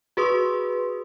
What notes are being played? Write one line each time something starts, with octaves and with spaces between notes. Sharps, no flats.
F#4 G#4 B4 C6 D#6